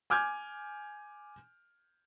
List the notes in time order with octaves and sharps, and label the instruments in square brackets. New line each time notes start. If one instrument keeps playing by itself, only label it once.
[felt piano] G#5 D6 F6 G6 G#6